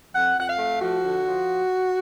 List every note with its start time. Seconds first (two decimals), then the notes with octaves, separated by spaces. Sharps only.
0.14 F2 F#5
0.37 F2 F#5
0.48 F5
0.58 A3
0.81 F3 F#4
1.04 D3
1.26 F3